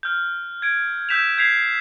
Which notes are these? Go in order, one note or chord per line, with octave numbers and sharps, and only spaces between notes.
F6 G6
G#6 D7
E6 G6 B6 E7 F7
G6 G#6 B6 C7 F7